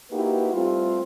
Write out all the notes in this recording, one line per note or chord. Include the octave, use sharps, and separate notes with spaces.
A#3 D#4 E4 F#4 G4 B4
G3 A3 C4 F4